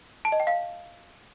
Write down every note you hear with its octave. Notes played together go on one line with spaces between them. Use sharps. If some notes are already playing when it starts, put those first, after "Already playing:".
A5
D#5
G5
F5